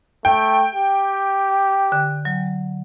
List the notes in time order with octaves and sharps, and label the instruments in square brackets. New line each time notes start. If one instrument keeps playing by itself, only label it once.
[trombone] A3 [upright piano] G5
[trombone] G4
[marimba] D3
F#3